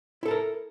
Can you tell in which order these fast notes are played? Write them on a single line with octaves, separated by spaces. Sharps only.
E4 A4 A5 A#4